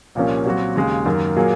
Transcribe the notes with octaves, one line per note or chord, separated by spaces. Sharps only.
C2 A#2 F3 A#3 C#4
A#2 F#3 C4 F#4
D#2 C#3 G#3
F#2 D#3 A#3
A#2 F#3 A#3 F4 G#4